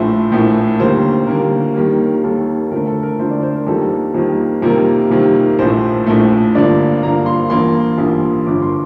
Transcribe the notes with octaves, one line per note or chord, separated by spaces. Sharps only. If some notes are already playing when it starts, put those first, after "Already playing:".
Already playing: A#1 A2 F3 A3 C5
A#1 A2 F3 A3
D#2 D3 G3 A#3 C5
D#2 D3 G3 A#3 A#4
D#2 D#3 G3 A#3
D#2 D#3 G3 A#3 A4
F2 D3 A3 A#4
A4
A#4
F2 D3 A3 C5
D5
C5
A#4
F2 D#3 G3 A#3 A4
F2 D#3 G3 A#3
F2 C3 D#3 G3 A#3 A#4
F2 C3 D#3 G3 A#3
A#1 A2 F3 A3 C5
A#1 A2 F3 A3
G2 D3 F3 A#3 D5
G2 D3 F3 A#3 A#5
C6
A1 G2 F3 A#3 C6
A1 G2 F3 A#3
G1 G2 F3 D6
C6